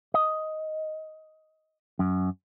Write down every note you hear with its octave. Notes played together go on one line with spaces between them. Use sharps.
D#5
F#2